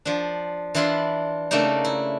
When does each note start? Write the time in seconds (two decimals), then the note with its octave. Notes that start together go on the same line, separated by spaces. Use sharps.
0.05 F3 D4
0.75 E3 D4 E4 F4 B5 C6
1.51 C#3 A3 A#3 D4 D#4
1.85 E4